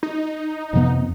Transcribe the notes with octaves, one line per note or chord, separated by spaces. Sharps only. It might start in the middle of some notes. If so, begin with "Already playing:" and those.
D#4
F2 C3 F3 B3